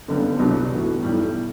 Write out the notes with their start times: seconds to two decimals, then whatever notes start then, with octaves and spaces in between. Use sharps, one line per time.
0.08 F#1 F#2 D3 G3 B3
0.39 C2 B2 F#3 B3 D4
0.71 A2 E3 B3 F#4
1.03 B1 A2 G3